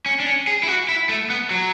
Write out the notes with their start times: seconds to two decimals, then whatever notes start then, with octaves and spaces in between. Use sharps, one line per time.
0.06 C#4
0.20 D4
0.26 C#4
0.47 G#4
0.63 E4
0.68 F#4
0.88 E4
1.09 A3
1.30 B3
1.51 F#3